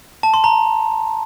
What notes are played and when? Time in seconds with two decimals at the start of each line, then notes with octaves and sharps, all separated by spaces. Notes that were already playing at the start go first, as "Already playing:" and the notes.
0.23 A5
0.34 C6
0.44 A#5